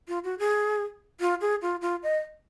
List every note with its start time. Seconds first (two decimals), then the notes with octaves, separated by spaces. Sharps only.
0.08 F4
0.24 F#4
0.39 G#4
1.20 F4
1.41 G#4
1.62 F4
1.82 F4
2.03 D#5